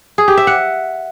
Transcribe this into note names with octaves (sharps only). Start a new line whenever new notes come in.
G#4
G4
E5
F#5